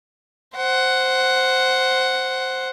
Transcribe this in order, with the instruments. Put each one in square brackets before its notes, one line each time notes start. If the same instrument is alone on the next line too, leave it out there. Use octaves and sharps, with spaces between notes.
[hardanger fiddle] C5 F#5